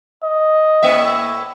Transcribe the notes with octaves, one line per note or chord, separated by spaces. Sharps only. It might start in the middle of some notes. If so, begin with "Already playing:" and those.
D#5
A2 A#3 E5